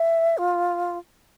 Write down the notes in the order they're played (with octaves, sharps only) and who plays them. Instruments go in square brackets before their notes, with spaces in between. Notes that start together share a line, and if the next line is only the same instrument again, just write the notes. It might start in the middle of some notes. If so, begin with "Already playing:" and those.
Already playing: [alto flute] E5
F4